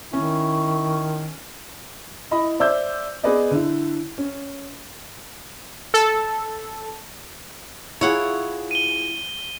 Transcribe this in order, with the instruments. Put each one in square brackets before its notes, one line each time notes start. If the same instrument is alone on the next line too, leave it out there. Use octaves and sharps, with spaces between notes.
[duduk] D#3 [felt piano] C#4 [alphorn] E4 [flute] C#6
[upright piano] E4 D#5 B5
C5 D5 E5 E6 G6
B3 G#4 B4 D5 D#5
D3 E4
C#4
[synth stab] A4
[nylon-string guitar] E4 F4 G#4 [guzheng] C#5 F#5
[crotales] D#7 G7